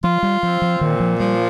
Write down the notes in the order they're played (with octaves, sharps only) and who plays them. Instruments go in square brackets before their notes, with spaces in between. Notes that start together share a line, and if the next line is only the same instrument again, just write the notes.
[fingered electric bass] F3 [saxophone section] F4
[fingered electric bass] G3
[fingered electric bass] F3 [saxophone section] C4
[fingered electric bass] F3
[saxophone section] A#2 [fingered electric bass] D#3
[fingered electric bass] F3
[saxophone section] F3 [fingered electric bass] G3